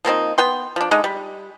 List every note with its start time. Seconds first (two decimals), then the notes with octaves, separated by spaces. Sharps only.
0.05 F3 A#3 C4 D#4
0.38 B3 G5 C6
0.76 F3 D4
0.91 D3 G#3 D#4
1.04 G3